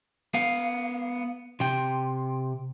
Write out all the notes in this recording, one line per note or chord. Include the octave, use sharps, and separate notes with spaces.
B3 F5
C3 G5